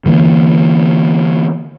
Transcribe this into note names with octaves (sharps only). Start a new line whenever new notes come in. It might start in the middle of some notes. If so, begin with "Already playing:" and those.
D3 E3 A3 A#3